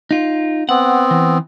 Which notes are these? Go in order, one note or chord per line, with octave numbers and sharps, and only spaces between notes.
D#4 F4
B3 C4 F#5
E3